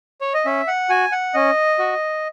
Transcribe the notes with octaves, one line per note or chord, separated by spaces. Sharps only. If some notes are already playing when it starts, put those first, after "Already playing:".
C#5
D#5
C#4 E5
F#5
F#4 G#5
F#5
C#4 D#5
F#4